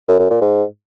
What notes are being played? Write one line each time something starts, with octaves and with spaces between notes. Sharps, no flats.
F#2
F#2
A#2
G#2